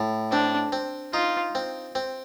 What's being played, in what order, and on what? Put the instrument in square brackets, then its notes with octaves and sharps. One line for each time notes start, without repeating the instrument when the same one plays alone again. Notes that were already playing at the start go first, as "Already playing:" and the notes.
Already playing: [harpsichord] A2
[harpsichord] C4 [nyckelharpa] D4
[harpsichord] C4
[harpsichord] D#4 [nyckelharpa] F4
[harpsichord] C4
C4